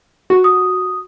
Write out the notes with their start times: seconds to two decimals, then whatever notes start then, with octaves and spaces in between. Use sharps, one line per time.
0.30 F#4
0.44 D#6